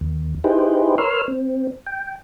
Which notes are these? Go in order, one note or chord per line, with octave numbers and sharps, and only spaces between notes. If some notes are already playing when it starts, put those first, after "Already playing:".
D#2
D#4 E4 G4 G#4 B4 C5
A#4 B4 C#5 C6 E6 F6
C4
G5